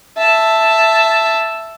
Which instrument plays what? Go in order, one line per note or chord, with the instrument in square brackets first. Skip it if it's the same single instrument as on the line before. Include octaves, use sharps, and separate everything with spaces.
[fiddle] E5 A5